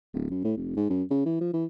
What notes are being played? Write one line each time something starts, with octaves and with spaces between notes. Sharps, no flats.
D1
F#2
A2
F1
G#2
F#2
C#3
E3
F3
E3